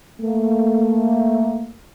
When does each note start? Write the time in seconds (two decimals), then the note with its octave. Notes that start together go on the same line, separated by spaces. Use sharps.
0.21 A3 A#3